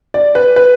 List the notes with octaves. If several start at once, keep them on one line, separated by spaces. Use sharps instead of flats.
D5
B4
B4